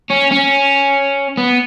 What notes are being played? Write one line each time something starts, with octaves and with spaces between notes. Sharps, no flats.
C#4
C#4
B3